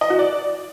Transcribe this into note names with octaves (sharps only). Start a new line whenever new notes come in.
D#5
F#4
D5